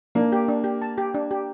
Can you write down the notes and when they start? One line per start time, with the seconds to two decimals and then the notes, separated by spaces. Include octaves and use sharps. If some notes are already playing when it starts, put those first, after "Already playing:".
0.15 A#3 D4
0.32 G4
0.48 D4
0.64 G4
0.82 A5
0.98 G4
1.14 D4
1.31 G4